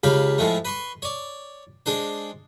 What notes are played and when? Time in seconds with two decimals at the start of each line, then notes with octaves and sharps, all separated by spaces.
0.04 C#2 C#3 G4 F5 B5
0.38 A2 F3 G#3 A3
0.65 B4 C6 C#6
1.02 C#5 D5
1.86 G#3 D4 C5